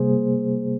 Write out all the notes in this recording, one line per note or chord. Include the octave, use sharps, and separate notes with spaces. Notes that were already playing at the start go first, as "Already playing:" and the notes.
Already playing: C3 G3 A#3 G#4 C5